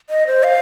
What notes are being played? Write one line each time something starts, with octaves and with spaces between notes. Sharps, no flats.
D#5
C5
F5